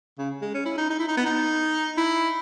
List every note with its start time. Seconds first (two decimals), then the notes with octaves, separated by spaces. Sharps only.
0.19 C#3
0.42 G#3
0.54 C#4
0.66 E4
0.78 D#4
0.90 D#4
0.99 E4
1.08 D#4
1.17 B3
1.26 D#4
1.97 E4